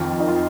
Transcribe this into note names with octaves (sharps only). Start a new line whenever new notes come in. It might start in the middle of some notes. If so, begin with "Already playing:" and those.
Already playing: F2 D#3 F4
D#4
F4